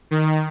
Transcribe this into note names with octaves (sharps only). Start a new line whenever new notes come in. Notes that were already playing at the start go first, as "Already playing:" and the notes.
D#3